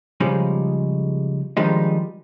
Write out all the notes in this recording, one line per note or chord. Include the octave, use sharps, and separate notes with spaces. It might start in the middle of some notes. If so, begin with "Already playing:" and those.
C#3 F3 G3 G#3 D#4
D#3 F3 G3 G#3 D4 D#4